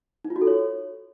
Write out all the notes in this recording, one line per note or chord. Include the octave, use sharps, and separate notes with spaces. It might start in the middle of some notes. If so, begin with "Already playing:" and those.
D#4
F4
F#4
A4
C#5